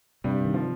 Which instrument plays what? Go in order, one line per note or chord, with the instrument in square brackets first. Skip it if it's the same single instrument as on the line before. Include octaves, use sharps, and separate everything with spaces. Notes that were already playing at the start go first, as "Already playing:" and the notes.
[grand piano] G2 G3 [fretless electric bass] C3
[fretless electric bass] D#3
[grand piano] F3